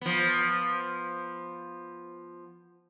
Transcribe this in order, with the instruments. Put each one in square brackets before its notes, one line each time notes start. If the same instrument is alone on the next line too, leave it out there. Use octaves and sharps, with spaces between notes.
[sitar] F3 B3